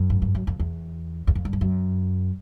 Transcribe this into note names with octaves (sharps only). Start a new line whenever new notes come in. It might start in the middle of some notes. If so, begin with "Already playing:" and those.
Already playing: F#2
G#2
G2
F#2
F2
E2
E2
F2
G2
F2
F#2